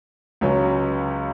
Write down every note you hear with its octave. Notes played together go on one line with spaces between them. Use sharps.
C#2 C#3 F#3 C#4